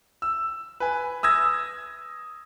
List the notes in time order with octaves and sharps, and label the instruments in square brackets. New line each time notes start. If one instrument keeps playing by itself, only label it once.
[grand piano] E6
B4 G#5
D#6 E6 G#6 A#6